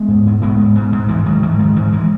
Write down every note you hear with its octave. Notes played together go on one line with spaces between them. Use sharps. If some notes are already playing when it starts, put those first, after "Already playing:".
Already playing: G#3 B3
G#2
G#2
G#2 G#3 B3
G#2
G#2
G#2
G#2 E3 G#3
G#2 D#3 F#3
G#2 E3
G#2 D#3
G#2 E3
E3 G#3